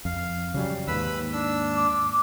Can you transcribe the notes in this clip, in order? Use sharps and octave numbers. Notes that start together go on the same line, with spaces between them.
F2 F5
C#3 F#3 G3
D#2 G#2 B4 B5 E6
D4 E6
D6